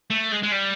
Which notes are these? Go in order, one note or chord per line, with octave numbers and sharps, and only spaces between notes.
A3
G#3
G#3
G3